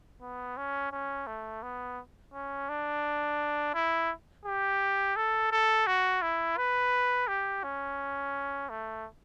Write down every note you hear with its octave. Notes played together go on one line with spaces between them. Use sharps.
B3
C#4
C#4
A3
B3
C#4
D4
E4
G4
A4
A4
F#4
E4
B4
G4
C#4
A3